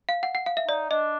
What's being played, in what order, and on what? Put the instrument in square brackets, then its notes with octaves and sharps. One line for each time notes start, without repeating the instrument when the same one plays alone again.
[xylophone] F5
F#5
F#5
F5
E5
[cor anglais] D#4 [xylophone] D5
[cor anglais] D4 [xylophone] D#5